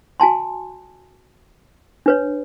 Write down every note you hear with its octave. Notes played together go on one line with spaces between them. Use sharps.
F#4 G#5 A5 C6
D4 B4 C#5